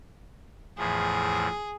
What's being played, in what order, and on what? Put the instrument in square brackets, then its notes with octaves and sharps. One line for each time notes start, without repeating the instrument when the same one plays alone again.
[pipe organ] E2 A2 F3 [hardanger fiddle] G#4